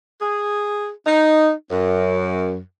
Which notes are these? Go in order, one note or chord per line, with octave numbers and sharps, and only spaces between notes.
G#4
D#4
F#2